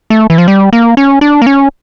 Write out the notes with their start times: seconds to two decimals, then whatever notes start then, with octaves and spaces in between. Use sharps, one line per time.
0.10 A3
0.30 E3
0.38 F3
0.48 G3
0.73 A#3
0.97 C#4
1.21 D4
1.42 A#3
1.47 C#4